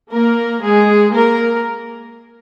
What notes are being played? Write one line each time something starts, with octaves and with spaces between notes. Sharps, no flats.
A#3 A#4
G#3 G#4
A#3 A#4